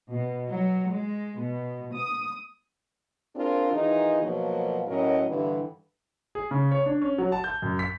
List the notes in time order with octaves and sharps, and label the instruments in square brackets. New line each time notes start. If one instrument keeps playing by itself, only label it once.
[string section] B2
F#3
G#3
B2
D#6
[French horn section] C4 D4 F4 G#4 A#4
D#3 E3 D#4 F4 G#4
B2 F3 F#3 A#3
A2 F#3 C#4 A#4 D#5
G2 D3 E3 G3 E4
[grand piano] G#4
C#3
C#5
D4
C#4
F#3
A5
G6
F#2
B6